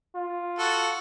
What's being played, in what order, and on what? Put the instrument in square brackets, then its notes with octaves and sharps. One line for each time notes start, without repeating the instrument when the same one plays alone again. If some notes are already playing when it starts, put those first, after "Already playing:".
[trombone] F4
[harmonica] F#4 A4